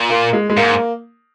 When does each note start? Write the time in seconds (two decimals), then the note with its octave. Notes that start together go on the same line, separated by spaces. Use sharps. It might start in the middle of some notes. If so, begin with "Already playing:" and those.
Already playing: A#2
0.10 A#3
0.33 G#3
0.50 G#3
0.57 G#2 A#3